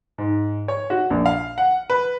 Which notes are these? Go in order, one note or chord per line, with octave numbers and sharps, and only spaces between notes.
G#2
C#5
F#4
A#1
F5
F#5
B4